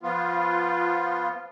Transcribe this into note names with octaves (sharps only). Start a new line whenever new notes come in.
F3 B3 F4